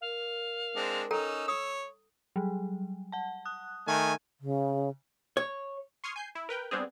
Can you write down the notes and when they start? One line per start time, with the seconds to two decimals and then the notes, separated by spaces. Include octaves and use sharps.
0.01 A#4 F5
0.76 G#3 C4 D4
1.11 C#4 D#4 A4 G5 A#5 E6
1.48 C#5 D#6
2.36 F#3 G3
3.12 F#5 A5
3.45 D#6 F#6
3.88 D#3 A3 G#5
4.41 C#3
5.37 C#5
6.04 C6 C#6 D#6 F6 G#6 C7
6.16 G#5 G6 C7
6.35 E4
6.49 A#4 B4 G5
6.71 G3 B3 C4 D4 G#4